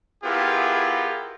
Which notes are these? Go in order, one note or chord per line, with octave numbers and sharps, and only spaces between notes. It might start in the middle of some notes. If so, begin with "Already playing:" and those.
B3 E4 F4 G4 G#4 A#4